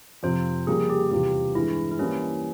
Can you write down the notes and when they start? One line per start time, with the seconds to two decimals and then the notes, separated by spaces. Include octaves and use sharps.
0.23 F2 C3 F3 C5
0.67 F2 C#3 G3 A#3 G#4
0.89 G4
1.11 E2 C3 G3 C4 F4 G4
1.55 G2 E3 G#3 E4
1.91 E4
1.99 E3 G3 A#3 C#4